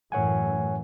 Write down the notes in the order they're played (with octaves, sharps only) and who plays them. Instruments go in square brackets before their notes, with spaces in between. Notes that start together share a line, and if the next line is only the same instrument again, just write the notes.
[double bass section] F#2 A2 E3 [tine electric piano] C#5 F#5 G#5